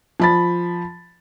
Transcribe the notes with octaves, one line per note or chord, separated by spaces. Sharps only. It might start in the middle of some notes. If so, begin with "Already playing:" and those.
F3 B5 A6